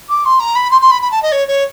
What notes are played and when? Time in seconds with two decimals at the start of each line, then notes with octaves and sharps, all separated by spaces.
0.09 D6
0.24 C6
0.39 A#5
0.55 B5
0.70 C6
0.80 C6
0.90 B5
1.01 B5
1.11 A5
1.22 D#5
1.31 C#5
1.47 C#5